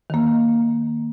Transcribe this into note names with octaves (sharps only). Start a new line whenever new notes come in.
D#3 A#3